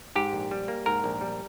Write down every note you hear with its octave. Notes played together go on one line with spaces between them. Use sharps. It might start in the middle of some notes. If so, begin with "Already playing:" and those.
G#2 G4
A#1
G3
A#3
G#2 A#4
A#1
G3